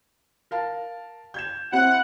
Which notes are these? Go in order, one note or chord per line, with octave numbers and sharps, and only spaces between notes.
A#4 F5 A5
G6 G#6 E7
C4 E4 F#5